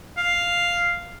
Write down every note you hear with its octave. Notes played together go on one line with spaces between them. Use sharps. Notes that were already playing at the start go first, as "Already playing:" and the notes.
F5